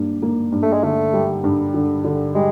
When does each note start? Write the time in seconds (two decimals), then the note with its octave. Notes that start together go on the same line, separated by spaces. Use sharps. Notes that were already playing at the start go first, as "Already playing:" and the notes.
Already playing: G2 A#3
0.22 A#3
0.52 G2
0.62 A3
0.73 G#3
0.83 D3 A3
1.13 G3
1.44 G2
1.74 D3
2.04 D3
2.35 G3 G#3